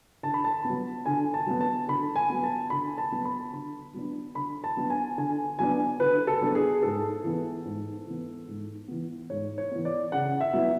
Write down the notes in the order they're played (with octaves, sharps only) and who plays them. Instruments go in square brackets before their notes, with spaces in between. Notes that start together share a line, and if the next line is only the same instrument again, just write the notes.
[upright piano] D3 A5
B5
A5
B3
F#3
D3 G#5
A5
F#3 B3
A5
D3 B5
G#5
F#3 B3
A5
D3 B5
A5
F#3 B3
B5
D3
F#3 B3 D4
D3 B5
A5
F#3 B3 D4
G#5
D3 G#5
F#3 B3 D4 G#5
D3 B4
A4
F#3 B3 D4
G#4
G#2 A4
E3 B3
G#2
E3 B3
G#2
E3 B3
G#2 C#5
C#5
E3 B3
D5
C#3 F#5
E5
F#3 B3 E4